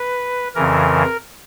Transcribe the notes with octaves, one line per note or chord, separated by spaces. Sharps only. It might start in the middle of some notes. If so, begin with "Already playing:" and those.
Already playing: B4
F2 C#3 E3 A#4